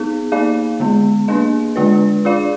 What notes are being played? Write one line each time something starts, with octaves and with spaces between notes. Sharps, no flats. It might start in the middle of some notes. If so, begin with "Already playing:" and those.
Already playing: B3 D#4 G#4
A#3 D#4 G#4 D5 F5
D3 G#3 B3
A#3 D4 G#4 D#5
D3 G#3 D4 F4 B4
D4 F4 G#4 D5 F5